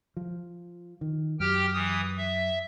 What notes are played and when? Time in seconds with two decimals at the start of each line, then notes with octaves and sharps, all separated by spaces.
0.17 F3
1.01 D#3
1.40 F#2 G4 G5 F6
1.73 E3 D#6
2.17 E5